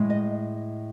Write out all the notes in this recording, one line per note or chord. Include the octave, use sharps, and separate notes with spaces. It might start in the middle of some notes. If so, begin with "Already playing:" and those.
Already playing: A2 G#3
D#5